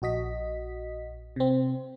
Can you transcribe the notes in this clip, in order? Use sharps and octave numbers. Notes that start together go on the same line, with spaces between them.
A#1 F#4 D#5 B6
C3 C4